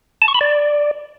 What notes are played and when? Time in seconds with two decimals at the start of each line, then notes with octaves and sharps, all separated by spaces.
0.22 A5
0.28 C#6
0.34 B5
0.41 D5